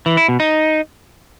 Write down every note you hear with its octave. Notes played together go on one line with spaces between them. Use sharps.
E3
E4
B2
D#4